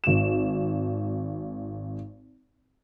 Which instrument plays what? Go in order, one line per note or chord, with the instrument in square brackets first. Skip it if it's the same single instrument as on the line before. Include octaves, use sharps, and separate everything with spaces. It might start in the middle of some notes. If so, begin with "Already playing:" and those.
[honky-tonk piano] G#1 E7